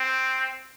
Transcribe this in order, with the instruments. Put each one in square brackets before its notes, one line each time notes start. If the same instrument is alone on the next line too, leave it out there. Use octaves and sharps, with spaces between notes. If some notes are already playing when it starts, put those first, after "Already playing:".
Already playing: [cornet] C4